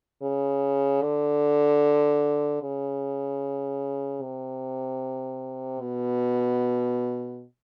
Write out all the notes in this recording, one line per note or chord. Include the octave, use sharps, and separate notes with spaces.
C#3
D3
C#3
C3
B2